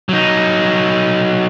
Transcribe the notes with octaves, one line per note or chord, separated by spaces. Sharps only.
F#3 D#4